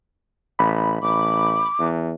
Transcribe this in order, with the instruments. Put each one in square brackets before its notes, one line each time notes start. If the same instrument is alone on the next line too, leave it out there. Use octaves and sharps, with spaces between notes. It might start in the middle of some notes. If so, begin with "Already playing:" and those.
[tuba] A1 [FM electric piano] B5
[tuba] A1 [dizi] D6
[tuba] E2